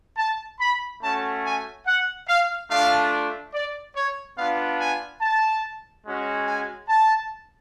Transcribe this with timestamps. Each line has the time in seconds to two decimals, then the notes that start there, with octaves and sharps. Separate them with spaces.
0.17 A5
0.60 B5
1.02 A3 C#4 F#4 A5
1.43 G#5
1.86 F#5
2.28 F5
2.70 A3 D4 F4 F5
3.53 D5
3.95 C#5
4.37 B3 D4 F4 F5
4.79 G#5
5.22 A5
6.05 G#3 C#4 F#4
6.47 G#5
6.89 A5